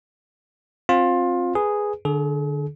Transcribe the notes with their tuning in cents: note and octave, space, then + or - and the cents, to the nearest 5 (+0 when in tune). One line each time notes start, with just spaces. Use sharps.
C4 +20 F4 +20
G#4 +0 B4 +0
D3 +15 G#4 +45